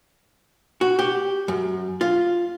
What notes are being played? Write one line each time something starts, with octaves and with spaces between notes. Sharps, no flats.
F#4
G4
F#2
F4